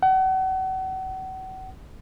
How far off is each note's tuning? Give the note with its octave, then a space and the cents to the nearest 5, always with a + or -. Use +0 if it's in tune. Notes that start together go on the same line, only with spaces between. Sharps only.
F#5 +35